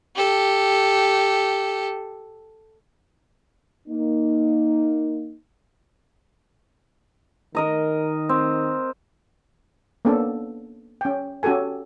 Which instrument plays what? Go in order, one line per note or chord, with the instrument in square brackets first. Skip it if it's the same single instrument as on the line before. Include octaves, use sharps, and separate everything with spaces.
[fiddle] G4 A4
[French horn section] A#3 D#4
[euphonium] D#3 [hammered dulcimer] A#4 D#5 A#5
[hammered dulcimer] C4
[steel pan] A#3 B3 C#4 D4 A4
C#4 G5
C#4 F#4 G4 A4 G#5